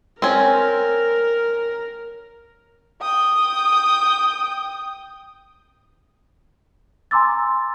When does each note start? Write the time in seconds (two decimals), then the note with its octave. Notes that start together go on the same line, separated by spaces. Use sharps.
0.22 C4 C#4 A#4
3.02 G5 D#6
7.11 G#5 A#5 C6 D6 E6 A6